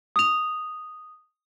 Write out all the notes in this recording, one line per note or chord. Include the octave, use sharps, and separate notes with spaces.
D#6 F7